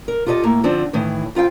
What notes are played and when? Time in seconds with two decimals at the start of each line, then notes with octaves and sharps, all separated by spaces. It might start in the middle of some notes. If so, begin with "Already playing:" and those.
0.08 A#4
0.26 F4 G4 A4 B4 D#5
0.43 A2 A#3
0.64 D3 F3 C4 D4
0.93 A2 D#3 E3
1.35 F2 F4 F5 G5